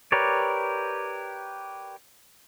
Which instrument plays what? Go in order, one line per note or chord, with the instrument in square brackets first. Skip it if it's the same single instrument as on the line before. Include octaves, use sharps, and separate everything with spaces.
[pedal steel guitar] G4 A#4 B4 C#5 D5